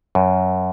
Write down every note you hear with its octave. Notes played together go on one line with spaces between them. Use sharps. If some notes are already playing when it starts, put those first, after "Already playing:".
F#2